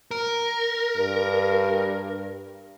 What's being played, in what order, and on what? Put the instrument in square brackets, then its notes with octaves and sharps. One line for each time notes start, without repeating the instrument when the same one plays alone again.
[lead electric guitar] A#4
[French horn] G2